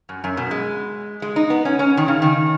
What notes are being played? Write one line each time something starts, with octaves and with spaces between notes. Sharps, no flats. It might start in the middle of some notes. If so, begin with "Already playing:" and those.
F#2
F#2
B2
G#3
G#3
D#4
B3
C#4
C#4
D#3
C#3
D#3